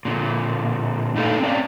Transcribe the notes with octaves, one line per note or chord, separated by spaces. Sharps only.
A#2 D3
A2 D4 D#4 A4 F5
C4 C#4 D5